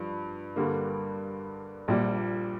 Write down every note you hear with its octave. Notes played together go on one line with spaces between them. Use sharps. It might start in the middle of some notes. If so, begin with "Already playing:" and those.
Already playing: G2 F3
G2 D3 G3 A#3
A#1 A#2 G3